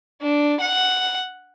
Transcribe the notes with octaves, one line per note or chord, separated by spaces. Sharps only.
D4
F#5